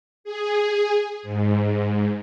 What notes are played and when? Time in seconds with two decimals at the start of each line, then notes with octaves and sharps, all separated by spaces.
0.24 G#4
1.23 G#2